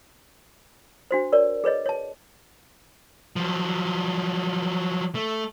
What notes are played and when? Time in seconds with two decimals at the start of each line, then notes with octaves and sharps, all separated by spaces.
1.11 D4 F#4 C5
1.32 A#4 C#5 D5
1.64 G#4 B4 C#5 D#5
1.86 C#5 A5
3.36 F3 F#3
5.15 A3